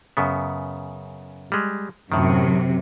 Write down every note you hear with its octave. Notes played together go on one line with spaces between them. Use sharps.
F#2 C#3 B3
G3 G#3
F#2 A2 C3 D#3